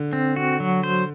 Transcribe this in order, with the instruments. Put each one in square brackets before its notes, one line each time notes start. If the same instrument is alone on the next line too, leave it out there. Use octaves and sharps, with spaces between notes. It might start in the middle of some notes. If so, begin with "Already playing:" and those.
Already playing: [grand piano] D3
[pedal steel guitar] C4
F#4
F#3
C5